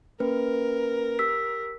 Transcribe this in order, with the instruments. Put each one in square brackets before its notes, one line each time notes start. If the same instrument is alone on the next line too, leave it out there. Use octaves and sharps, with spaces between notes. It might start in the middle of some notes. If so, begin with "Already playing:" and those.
[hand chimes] A#3 C#4 B4 [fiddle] A#4
[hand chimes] G4 E6 B6